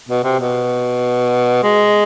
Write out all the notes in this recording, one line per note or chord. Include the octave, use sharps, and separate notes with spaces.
B2
C3
B2
G#3